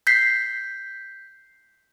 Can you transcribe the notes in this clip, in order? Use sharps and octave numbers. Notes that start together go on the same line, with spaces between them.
G6 B6 C7